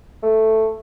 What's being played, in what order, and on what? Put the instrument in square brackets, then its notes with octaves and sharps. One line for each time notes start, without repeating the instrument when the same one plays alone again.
[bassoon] A3